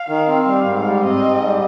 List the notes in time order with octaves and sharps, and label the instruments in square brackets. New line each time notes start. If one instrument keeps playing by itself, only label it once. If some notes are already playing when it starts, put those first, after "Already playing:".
Already playing: [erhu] F5
[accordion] D#3
C4
[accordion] G3 [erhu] F5
[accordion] G#2
G3
[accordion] C4 [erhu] D#5
[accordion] G#2
G3